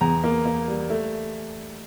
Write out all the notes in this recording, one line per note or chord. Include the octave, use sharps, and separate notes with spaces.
E2 A#5
A#3
A#3
G3
A3